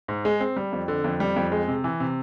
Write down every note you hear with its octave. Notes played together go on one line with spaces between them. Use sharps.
G#2
G#3
C4
G3
F2
D3
F2
G3
F2
G#3
C3
E3
C3